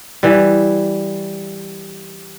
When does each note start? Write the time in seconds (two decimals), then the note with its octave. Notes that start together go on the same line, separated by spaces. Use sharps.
0.23 E3 G3